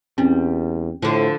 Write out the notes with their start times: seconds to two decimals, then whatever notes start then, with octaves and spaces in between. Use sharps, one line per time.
0.18 E2 G3 C4 C#4
1.02 A2 D3 F3